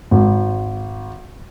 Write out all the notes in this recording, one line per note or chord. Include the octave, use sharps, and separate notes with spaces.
G#1